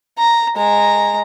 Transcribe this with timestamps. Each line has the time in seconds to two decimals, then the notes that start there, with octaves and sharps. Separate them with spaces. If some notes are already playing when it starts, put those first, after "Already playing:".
0.18 A#5
0.57 G#3 A#5